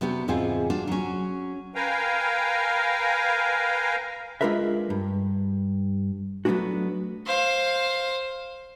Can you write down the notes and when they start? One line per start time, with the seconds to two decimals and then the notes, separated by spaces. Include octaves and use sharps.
0.01 C3 B3 D4 F#4 G4
0.28 E2 G#2 C3 C4 F4 G#4
0.70 D4 F4 F#4
0.87 F#3 C#4
1.75 A#4 B4 F5 G5 G#5 A#5
4.41 G#3 D4 F4 A#4 B4 E5
4.90 G2
6.45 F#3 A3 B3 C#4 D4 F#4
7.26 C5 F5